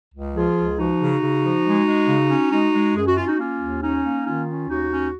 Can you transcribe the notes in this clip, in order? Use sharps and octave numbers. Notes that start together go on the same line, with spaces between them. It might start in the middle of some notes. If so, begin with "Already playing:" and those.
C#2
F3 F4 G#4
C#2
F3 D#4 F#4
C#3
C#3
F3
G#3
G#3
C#3
C#4
G#3 D#4 F#4
G#3
F#2 G#4
F#4
C#4 F4
D#4 F#4
A#3 C#4 F4
D#2
C#4 D#4
A#3
D#3 C#4 F4
C#4
D#2 D#4 F#4
C#4